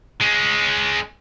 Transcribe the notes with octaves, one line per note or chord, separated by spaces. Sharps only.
G#3 C#4